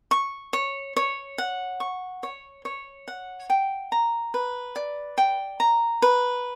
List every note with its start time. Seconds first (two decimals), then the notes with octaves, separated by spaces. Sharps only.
0.11 C#6
0.53 C#5
0.96 C#5
1.38 F#5
1.80 C#6
2.23 C#5
2.65 C#5
3.08 F#5
3.50 G5
3.92 A#5
4.34 B4
4.76 D5
5.18 G5
5.60 A#5
6.02 B4